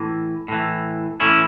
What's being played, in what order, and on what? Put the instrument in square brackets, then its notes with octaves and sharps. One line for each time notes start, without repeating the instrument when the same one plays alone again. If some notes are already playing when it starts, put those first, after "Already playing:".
Already playing: [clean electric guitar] A2 E3
A2 E3
A2 E3 C#4 E4